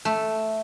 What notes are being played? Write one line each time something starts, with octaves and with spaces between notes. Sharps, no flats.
A3